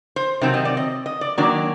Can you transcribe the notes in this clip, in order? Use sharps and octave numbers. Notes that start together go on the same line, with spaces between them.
C5
C3 D#3 F#3 C4
D#5
D5
D#5
D#5
D5
D#3 F#3 A#3 D4 D5